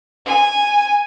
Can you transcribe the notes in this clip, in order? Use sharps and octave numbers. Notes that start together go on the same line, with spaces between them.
G#5